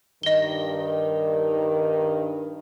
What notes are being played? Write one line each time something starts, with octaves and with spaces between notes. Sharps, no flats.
G2 D#3 D#5 G7